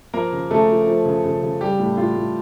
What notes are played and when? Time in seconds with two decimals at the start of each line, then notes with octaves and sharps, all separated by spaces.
0.14 F3 A#3 A#4
0.32 C#3
0.50 C#3 A3 A4
0.69 F3
0.87 F3
1.05 C#3
1.24 C#3
1.42 C#3
1.61 G3 G4
1.79 A2
1.97 A2 F4
2.16 A2